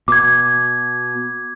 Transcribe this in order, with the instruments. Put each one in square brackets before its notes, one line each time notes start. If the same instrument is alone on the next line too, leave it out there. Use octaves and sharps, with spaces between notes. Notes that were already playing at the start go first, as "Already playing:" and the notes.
[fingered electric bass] B2 [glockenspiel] D6 G#6